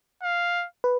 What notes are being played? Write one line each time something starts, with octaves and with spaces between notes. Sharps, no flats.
F5
B4